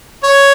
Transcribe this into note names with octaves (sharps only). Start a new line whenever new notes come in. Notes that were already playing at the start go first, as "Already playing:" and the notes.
C#5